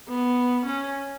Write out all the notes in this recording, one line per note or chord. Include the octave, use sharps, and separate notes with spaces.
B3
C#4